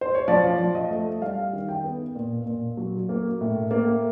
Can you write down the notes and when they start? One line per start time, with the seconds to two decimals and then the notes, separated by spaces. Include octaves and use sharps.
0.01 C5
0.15 C#5
0.28 F3 D5
0.58 F3
0.75 D#5
0.90 A3
1.21 G3 F5
1.53 D#3
1.68 G5
1.84 B3
2.15 A#2
2.46 A#2
2.77 F#3
3.09 A#3
3.41 A2
3.71 A#3